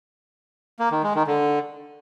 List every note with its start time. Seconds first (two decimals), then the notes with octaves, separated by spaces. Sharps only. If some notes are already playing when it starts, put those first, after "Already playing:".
0.80 A#3
0.91 D#3
1.03 G#3
1.15 D#3
1.27 D3